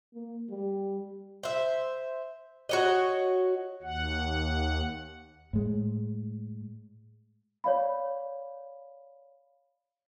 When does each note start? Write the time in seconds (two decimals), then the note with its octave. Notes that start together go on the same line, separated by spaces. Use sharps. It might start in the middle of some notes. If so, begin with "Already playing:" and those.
0.14 A#3
0.50 G3
1.43 C5 E5
2.69 F#4 C#5 D#5
3.83 D#2 F#5
5.53 A2 G#3
7.64 C#5 D5 F5 B5